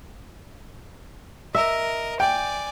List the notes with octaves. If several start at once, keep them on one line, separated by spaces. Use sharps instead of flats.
A#4 D#5 E5
D5 G5 G#5